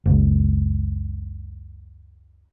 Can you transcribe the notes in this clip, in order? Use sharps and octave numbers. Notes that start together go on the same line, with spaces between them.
F#1 C#2